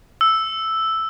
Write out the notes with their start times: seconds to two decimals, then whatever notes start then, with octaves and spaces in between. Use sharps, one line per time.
0.21 E6